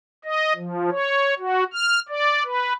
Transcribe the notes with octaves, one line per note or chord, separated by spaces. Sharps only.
D#5
F3
C#5
F#4
F6
D5
B4